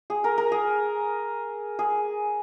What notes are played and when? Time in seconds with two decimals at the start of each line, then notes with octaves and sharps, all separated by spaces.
0.10 G#4
0.24 A#4
0.38 A#4
0.52 G#4
1.79 G#4